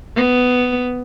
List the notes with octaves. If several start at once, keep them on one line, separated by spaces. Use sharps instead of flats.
B3